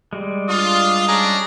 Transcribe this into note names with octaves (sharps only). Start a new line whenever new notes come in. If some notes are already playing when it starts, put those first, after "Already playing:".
G3 G#3
D4 F4 D#6
C#4 D4 G#4 A#5